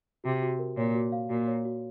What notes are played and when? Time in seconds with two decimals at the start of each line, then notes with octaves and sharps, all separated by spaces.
0.24 C3 F#4
0.42 F#4
0.59 A#4
0.77 A#2 C#5
0.95 F#4
1.12 F5
1.30 A#2 F#4
1.47 C#5
1.65 F#4